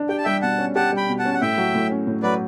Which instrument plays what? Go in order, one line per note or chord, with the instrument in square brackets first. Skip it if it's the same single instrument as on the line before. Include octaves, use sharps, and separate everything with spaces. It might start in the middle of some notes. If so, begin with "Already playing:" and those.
Already playing: [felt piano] D4
[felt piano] G4 [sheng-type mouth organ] G5
[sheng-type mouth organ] A5
[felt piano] G3 [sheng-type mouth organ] E5 G5
[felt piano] B2 [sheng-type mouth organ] F#5 A5
[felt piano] C#4
[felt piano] G4 [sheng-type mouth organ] F#5 A5
[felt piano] G3 [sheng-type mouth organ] G5 B5
[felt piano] B2
[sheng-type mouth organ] F#5 A5
[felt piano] C#4
[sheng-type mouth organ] F#5
[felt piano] A2 [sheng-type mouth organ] E5 G5
[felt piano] F#3
A2
C#4
A2
[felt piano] F#3 [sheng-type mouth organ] B4 D5